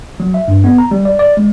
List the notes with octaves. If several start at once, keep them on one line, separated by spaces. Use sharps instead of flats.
F#3
E5
G2
B3
A#5
G3
D5
D5
G#3